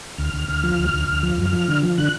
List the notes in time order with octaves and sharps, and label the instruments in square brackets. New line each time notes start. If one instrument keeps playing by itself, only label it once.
[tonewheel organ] D2 F6
D2
D2
F3
D2
D2
D2
F3
F#2
F3
D3
F3
D3 F#6